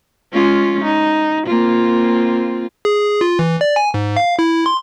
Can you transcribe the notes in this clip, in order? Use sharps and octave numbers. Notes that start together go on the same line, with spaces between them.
G#3 C#4 F4
D#4
A#3 C4 F4
G#4
F4
E3
D5
G#5
G#2
F5
E4
C6